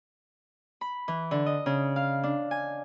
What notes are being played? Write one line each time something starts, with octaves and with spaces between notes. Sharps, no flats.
B5
E3
D3
D#5
C#3
F5
D4
G#5